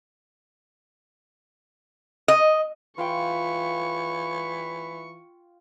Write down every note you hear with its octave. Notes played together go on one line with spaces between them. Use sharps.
D#5
E3 F4 G5 B5 C#6